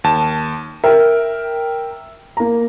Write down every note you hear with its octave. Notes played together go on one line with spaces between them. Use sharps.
D#2 A5
A#4 E5 G5
A#3 A#5